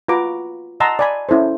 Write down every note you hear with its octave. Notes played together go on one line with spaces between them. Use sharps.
F4 F#4 B4 A#5 D6
D#5 F#5 A5 A#5 C6 E6
D5 G#5 B5
C#4 E4 A4 C5